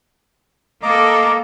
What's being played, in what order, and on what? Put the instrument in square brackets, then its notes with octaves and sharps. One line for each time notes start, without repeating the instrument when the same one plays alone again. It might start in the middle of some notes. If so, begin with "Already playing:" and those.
[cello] A#3 A4 [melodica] D#5 A#5 D6